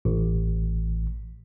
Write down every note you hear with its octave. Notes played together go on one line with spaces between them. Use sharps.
A1